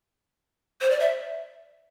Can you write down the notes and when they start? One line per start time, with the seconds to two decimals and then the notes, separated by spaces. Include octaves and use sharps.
0.81 C5
0.90 D5
1.00 E5